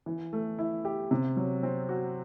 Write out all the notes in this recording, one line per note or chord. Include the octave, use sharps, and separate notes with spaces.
E3
A3
E4
G4
C3
F#3
C4
F#4